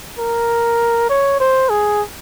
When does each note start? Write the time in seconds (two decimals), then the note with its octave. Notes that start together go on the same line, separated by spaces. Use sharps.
0.19 A#4
1.10 C#5
1.40 C5
1.70 G#4